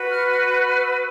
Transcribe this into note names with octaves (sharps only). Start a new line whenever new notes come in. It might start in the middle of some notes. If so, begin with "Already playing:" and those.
Already playing: F#4 B4
F6
F6
F#6
F6
E6